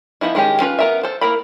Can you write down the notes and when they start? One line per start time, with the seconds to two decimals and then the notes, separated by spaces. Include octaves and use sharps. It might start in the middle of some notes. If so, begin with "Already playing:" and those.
0.21 F3 B3 D#4 E4
0.35 D#3 G#3 C#4 G4
0.61 C#4 F4 B4
0.79 B3 A#4 E5
1.03 A4 C5
1.21 A#3 E4 A#4 B5